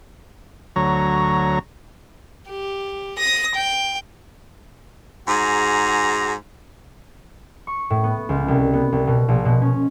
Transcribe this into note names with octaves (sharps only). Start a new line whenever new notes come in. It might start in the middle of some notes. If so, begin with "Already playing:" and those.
D2 F#3 C#5 A#5
G4
D#6 A#6
G5
G#2 F#4 G#4 A#5
C#6
A2
B3
C#2
C2
B3
C2
B2
A#1
B2
C#4